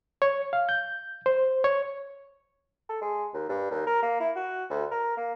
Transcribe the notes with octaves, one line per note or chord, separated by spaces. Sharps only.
C#5
F5
G6
C5
C#5
A4
G#3
D#2
G2
D#2
A#4
A#3
E4
F#4
D2
A#4
A#3